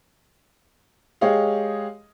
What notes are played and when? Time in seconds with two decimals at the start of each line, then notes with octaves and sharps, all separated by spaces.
1.21 G#3 G4 G#4 C#5 D#5 F5